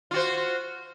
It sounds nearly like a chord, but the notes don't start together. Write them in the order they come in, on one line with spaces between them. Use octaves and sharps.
F4 F#4 C5